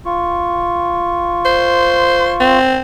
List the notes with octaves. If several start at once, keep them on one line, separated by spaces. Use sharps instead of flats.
F4 C#6
C5
C4